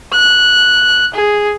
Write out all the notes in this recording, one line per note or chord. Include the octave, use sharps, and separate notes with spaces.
F#6
G#4